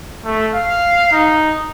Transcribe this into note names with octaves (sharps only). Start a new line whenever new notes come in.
A3
F5
D#4